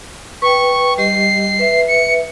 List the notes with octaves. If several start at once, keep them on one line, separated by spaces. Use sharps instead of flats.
B4 G5 C#6
G3 G4 D#5 C7
B4 E5
C#7